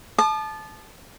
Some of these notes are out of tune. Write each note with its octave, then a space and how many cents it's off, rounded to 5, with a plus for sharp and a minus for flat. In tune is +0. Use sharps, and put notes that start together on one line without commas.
A5 -20 D#6 -45